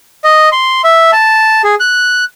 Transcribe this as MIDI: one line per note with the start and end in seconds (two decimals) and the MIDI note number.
0.24 0.49 75
0.52 0.82 84
0.84 1.11 76
1.12 1.62 81
1.64 1.75 68
1.80 2.24 90